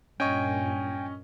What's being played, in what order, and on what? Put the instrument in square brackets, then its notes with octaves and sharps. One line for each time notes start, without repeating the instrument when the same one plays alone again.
[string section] G2 A#2 [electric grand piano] C#4 D#5 C#6 [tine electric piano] G5 G#5